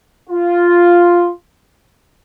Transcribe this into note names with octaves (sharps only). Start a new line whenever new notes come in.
F4